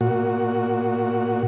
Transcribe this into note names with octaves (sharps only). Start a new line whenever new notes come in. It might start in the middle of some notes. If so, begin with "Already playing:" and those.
A#2 F#4